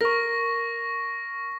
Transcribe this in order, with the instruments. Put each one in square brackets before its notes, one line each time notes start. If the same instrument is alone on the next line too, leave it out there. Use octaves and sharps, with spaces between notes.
[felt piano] A#4 [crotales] C#6 A#6